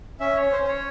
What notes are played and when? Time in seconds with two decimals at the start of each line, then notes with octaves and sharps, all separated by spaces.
0.20 C#4 E5
0.36 C#5
0.41 C#4
0.52 C5
0.63 C#4 C#5